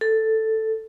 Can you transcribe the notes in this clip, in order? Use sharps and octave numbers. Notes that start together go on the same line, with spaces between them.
A4